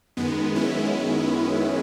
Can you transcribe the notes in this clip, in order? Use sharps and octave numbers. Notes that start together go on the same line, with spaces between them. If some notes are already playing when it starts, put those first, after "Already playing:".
F#2 D#3 G#3 B3
C#4 E4